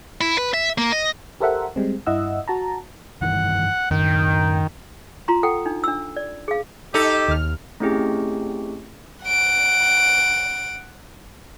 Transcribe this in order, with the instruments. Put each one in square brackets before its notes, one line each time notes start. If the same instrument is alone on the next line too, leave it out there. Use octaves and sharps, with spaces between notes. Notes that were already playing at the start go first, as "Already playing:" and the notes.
[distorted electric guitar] E4
B4
E5
A#3
D#5
[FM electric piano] G4 A4 A#4 C5 E5 F#5
G3 G#3 C4
G2 E4 D#5 F#5 E6
F#4 A5 A#5
[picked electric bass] G2 D#3 E3 [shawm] F#5
[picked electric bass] F#2 A2 [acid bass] D#3 [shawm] G5
[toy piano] F4 A#5 C6
A4 F#5 G5
D4 D#4
D4 E6
D5
G#4 F5
[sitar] D#4 A4 [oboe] G4
[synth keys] D#2 F6
[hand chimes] A3 C4 C#4 E4 G4 G#4
[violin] F#5 D7